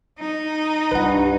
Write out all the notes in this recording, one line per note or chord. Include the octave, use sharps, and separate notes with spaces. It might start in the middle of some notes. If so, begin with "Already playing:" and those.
D#4
C2 G2 F4 B4 F#5